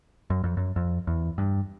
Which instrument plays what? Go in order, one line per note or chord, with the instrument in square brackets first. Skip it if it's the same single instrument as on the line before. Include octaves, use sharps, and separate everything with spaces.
[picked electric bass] F#2
F2
F#2
F2
E2
G2